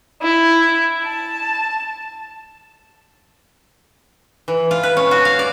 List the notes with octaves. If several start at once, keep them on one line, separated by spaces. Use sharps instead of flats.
E4
A5
E3
F4
B4
C#4
F#4
F5
D5